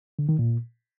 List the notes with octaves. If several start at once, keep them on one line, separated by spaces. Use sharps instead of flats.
D3
D#3
A#2